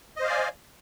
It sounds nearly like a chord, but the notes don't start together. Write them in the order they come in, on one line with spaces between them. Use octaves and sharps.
D#5 C5 F5 D5 G#5